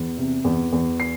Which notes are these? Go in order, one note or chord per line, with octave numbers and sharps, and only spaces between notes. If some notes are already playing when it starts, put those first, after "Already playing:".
Already playing: E2
C3
E2
E2
C7